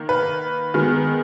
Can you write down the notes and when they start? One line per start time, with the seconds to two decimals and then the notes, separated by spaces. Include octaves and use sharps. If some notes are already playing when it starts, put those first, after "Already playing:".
Already playing: D#3 A#3
0.09 B4
0.74 D#3 G#3 B3